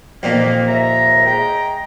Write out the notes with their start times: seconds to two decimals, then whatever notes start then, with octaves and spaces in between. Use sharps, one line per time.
0.23 F2 A#2 D#3 E3 A#3
0.66 D#2 E5 A#5
1.25 G#3 G5 A#5